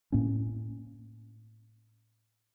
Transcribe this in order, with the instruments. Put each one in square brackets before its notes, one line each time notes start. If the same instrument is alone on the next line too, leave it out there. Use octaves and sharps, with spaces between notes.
[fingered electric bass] A2 A#3 C#4